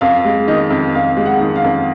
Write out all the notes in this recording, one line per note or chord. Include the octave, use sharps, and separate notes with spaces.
F2 F5
G#3
D#3 D#5
F2
F2 F5
G#3
F#5
D#3
F5
F2